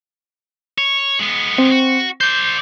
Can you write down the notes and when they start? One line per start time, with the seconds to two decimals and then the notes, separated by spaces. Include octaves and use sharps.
0.78 C#5
1.19 G#3 B3
1.58 C4
1.71 F#4
2.21 C5 D5 G6